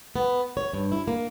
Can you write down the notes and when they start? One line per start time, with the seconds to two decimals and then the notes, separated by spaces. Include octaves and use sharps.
0.16 B3
0.57 C#5
0.73 G2
0.92 E4
1.08 A#3